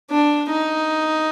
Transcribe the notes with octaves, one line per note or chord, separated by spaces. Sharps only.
D4
D#4